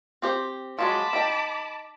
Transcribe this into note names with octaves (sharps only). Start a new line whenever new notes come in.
C4 G4 C5
F3 F#3 G#3 A5 B5 D6
D#4 G5